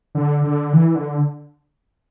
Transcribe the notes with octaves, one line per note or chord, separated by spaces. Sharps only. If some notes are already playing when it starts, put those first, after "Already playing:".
D3
D3
E3
D3